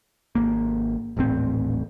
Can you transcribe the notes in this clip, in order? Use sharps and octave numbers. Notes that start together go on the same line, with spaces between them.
G#1 A#3
D#1 A1 A2 C4